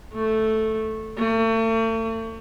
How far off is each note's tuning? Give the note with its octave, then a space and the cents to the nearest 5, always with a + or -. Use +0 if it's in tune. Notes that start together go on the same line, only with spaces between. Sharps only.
A3 -5
A3 +40